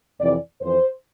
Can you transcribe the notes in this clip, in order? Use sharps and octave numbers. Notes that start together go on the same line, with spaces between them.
F2 C3 E3 D5
F2 E3 C5